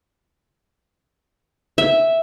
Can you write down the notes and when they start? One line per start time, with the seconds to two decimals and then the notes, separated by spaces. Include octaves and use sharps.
1.78 E5